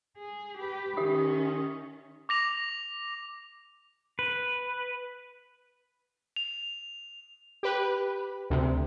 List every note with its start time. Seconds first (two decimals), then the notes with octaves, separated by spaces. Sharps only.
0.18 G#4
0.58 G4 B4
0.97 D#3 C#4 G4 E5 D#6
2.29 D6 A#6 F7
4.19 B4
6.36 F7
7.63 G4 B4
8.50 D2 C3